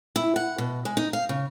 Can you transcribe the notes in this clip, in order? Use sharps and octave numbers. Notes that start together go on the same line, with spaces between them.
E4
F#5
B2
G#3
D#4
F5
C#3